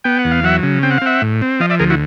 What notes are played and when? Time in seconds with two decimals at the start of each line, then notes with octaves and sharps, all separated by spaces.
0.04 B3 G5
0.19 F#5
0.25 E2
0.31 F5
0.44 F#3 E5 F#5
0.63 C#3
0.83 C4 G5
0.91 F#5
0.98 F5
1.02 C4 E5 F#5
1.22 A2
1.42 C4
1.60 F3 D#5 F5
1.70 D5 E5
1.79 D2 G#4 A#4
1.90 E4 F#4